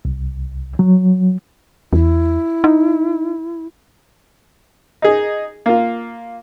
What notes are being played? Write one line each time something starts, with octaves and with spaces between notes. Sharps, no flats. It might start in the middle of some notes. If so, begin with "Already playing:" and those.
C2
F#3
E2 E4
D#4
D#4 G#4
A#3 F4